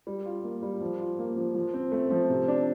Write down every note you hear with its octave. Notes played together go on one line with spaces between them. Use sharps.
G3
F4
A#3
G3
F3
F4
A#3
F3
F3
C4
A3
F3
C3
D4